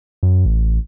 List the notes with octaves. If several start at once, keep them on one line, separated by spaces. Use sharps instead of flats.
F#2
A1